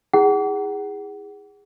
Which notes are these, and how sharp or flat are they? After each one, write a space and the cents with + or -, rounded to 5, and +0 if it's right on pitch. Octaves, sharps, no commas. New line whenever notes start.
E4 -15 G#4 -20 F#5 +25